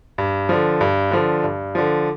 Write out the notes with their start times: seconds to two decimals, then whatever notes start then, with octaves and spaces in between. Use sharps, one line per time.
0.18 G2
0.49 D3 F3
0.81 G2
1.11 D3 F3
1.44 G2
1.75 D3 F3